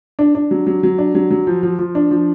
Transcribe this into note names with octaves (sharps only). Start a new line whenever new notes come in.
D4
D4
F#3
F#3
F#3
D4
F#3
F#3
F3
F3
F3
D4
F3